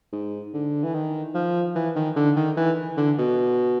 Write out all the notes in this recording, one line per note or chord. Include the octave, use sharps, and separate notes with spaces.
G#2
D3
E3
D#3
F3
E3
D#3
D3
D#3
E3
D3
B2